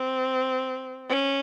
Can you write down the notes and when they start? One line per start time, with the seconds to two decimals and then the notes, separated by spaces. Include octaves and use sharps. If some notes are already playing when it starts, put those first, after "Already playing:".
Already playing: C4
1.09 C#4